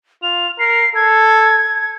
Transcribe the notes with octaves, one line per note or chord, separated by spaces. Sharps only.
F4 F7
A#4 C7
A4 G#6